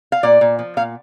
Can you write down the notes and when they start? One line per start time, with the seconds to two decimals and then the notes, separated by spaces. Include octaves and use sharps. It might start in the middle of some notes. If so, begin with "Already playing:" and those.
0.12 F5
0.23 A#2 D5
0.41 A#2
0.59 F3
0.77 A#2 F5